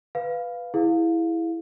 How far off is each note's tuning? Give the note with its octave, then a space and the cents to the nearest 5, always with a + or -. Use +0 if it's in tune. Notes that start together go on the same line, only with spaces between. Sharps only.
B4 +0 F5 +0
E4 +0 G#4 +0 F5 +15